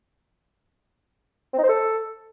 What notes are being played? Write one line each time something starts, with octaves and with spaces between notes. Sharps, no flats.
C4
D#4
C5
A4